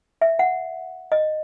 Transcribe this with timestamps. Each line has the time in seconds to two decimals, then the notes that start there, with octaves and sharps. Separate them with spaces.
0.21 E5
0.39 F#5
1.12 D#5